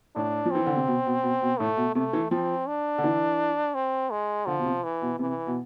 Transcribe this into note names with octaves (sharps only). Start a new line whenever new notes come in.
A2 D4
F3
E3 C4
D3
C3
B2
B2
B2
B2
A2 A3
B2
C3 A3
E3
F3 C4
D4
D3
E3
C4
G#3
D3 F3
B2
C3
E3
B2
C3 E3
B2